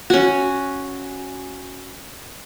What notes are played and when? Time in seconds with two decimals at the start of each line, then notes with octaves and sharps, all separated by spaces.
0.10 C#4 F#4